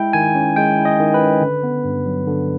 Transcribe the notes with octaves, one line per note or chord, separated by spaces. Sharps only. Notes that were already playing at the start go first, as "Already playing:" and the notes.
Already playing: G#3 E4 G5
D#3 G#5
C#4
G#3 G5
E4
D#5
D#3
B4
C#4
D3
B3
G2
F#3
D3